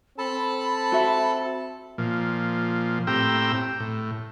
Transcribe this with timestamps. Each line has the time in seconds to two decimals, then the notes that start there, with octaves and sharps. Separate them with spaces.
0.18 C4 A4 A5 B5
0.92 F#4 E5
1.98 A#2 F3
3.07 A2 C4 G4 G5 A#5 E6
3.80 A2